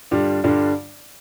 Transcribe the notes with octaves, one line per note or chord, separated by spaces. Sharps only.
G2 D3 G3 D4 F4
G2 D3 G3 D4 F4